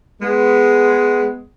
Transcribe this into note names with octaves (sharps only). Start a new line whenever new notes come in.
G#3 B3